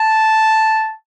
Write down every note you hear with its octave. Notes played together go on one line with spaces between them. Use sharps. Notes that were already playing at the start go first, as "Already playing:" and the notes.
Already playing: A5